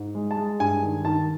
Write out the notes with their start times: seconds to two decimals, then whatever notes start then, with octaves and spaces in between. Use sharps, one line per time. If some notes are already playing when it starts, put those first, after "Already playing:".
Already playing: G#2
0.15 G#3
0.31 A5
0.37 G#3
0.60 G2 G#5
0.83 D#3
1.05 D#3 A5